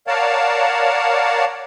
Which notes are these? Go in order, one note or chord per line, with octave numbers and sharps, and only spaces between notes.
A#4 C#5 D5 F5 F#5 A5